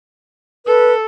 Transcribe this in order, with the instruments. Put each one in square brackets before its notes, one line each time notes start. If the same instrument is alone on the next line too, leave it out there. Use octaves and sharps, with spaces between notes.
[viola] A4 [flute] B4